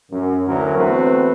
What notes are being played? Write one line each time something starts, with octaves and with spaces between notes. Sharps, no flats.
F#2
D2 E3 F#3 A#4
E2 A3 C4 F#4 B4